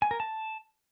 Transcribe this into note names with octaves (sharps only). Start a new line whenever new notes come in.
G#5
A#4
A5